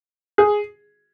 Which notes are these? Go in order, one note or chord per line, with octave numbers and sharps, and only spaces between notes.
G#4